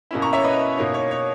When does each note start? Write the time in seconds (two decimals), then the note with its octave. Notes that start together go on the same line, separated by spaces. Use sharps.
0.11 B2 A#3 C#4 E4
0.22 A#5 C#6
0.33 C#5 E5
0.44 B4 D#5
0.77 B2 A#3 D#4 C#5
0.94 C#5
1.11 C#5